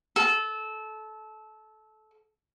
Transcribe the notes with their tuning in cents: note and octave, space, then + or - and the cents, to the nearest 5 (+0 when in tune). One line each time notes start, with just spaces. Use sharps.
A4 -20